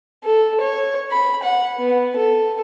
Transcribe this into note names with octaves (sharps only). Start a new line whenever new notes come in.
A4
C#5
B5
F#5
B3
A4